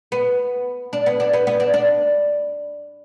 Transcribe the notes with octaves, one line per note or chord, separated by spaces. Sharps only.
B3
D4
B3
D4
B3
B3
D4
D4